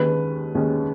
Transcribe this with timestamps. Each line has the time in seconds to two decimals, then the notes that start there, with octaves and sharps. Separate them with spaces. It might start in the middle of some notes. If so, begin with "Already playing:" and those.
Already playing: D#2 D#3 G#3 C#4 B4
0.55 D#2 D#3 G#3 C#4